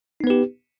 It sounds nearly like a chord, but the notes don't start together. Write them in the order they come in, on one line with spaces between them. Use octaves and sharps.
D#4 B3 B4 G4